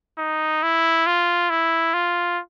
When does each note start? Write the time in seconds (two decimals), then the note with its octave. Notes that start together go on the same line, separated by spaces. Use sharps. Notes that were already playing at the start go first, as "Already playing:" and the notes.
0.18 D#4
0.63 E4
1.06 F4
1.50 E4
1.94 F4